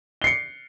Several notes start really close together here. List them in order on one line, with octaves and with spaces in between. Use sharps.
G7 C7 C#7